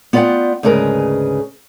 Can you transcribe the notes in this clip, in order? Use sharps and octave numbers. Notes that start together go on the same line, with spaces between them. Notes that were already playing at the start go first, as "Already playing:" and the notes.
B3 F4 D5 D#5 F#5 G5
D2 G#2 C#3 G#4 A#4 B4